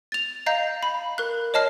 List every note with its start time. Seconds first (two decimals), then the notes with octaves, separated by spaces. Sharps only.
0.12 A6 F7
0.46 D#5 F5 A#5 G6 C7
0.83 B5
1.18 A#4 F#6
1.54 C#5 D#5 A5 F6 C7